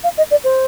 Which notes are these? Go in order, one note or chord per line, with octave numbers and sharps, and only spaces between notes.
F5
D#5
D5
C5